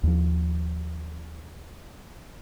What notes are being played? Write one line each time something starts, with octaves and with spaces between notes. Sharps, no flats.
D#2 F3